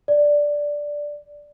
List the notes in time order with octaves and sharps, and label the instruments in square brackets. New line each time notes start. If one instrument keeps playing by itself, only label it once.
[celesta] D5